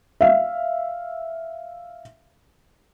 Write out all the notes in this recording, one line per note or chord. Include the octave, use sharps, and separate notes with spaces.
E5 F5